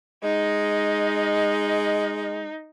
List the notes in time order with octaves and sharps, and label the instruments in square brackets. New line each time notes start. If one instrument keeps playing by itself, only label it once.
[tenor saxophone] G#3 [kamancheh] D#4